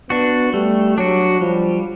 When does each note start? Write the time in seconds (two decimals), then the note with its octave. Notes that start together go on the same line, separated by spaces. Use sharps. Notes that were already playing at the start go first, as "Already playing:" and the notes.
0.10 B3 D4 F#4
0.53 G3 A3
0.98 F#3 D4 F#4
1.41 F3 G3